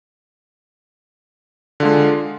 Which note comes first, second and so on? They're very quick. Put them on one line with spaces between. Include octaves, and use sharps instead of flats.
D3 F4 G#3